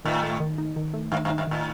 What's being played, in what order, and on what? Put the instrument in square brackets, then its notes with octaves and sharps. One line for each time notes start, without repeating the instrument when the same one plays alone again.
[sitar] A2 [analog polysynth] D#3
[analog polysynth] A3
D#3
D#4
D#3
A3
[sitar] G2 [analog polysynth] D#3
[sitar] G2
[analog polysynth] D#4
[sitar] G2
[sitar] A2 [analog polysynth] D#3